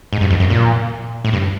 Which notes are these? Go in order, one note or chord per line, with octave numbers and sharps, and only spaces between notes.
G#2
G2
F2
F#2
A#2
A2
G2